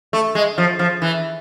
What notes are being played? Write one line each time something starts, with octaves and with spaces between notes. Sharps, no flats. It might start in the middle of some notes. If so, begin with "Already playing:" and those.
A3
G#3
F3
F3
E3